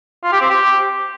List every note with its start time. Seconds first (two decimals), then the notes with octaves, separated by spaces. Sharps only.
0.24 F4
0.33 G4
0.41 C4
0.50 G4